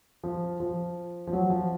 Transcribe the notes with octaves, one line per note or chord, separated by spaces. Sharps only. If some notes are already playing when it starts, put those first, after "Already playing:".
F3
F3
F3
F#3
F3